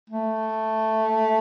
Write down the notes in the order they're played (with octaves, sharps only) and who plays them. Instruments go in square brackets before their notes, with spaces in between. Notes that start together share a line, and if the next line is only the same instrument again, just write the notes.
[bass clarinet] A3